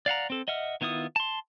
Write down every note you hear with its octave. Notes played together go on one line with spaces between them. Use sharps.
D5 F5 F#5 A#5
C4 A4
D#5 E5 F#5 F6
D#3 B3 E4 F4 D#6
A5 C6